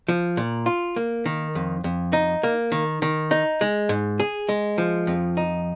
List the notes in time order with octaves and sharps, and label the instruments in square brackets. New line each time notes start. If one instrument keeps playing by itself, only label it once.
[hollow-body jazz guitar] F3
A#2
F4
A#3
D#3
F2
F2
D#4
A#3
D#3
D#3
D#4
G#3
G#2
G#4
G#3
F3
F2
D#4